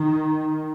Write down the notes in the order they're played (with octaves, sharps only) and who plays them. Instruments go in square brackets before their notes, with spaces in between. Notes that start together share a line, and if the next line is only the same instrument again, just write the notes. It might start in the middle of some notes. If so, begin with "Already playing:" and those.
Already playing: [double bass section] D#3